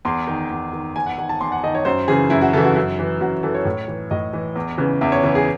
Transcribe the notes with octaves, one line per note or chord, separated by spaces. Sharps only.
E2 C6
D#3
E2
D#3
E2 G#5
F#5
D#3 F#5
A5
E2 C6
F#5
D#3 D#5
C#5
F#2 C5
C#3 E3 G#4
F#2 E4
F#4
C#3 E3 A4
F#4
F#2
E3
F#2 F#4
E3 A4
C#5
A2
E3
A2 D#5
E3
E2
C#3 E3
E2 E5
C#5
C#3 E3
G#4